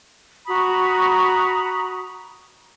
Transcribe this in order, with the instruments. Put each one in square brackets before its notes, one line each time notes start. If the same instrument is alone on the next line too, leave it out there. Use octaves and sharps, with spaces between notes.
[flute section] F#4 A#5 B5 D#6